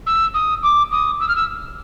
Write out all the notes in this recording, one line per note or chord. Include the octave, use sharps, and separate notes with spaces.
E6
D#6
D6
D#6
E6
F6
E6